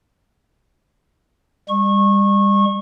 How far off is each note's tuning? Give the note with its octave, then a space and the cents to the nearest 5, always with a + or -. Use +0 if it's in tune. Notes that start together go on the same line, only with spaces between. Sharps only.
G3 +35 C#6 -25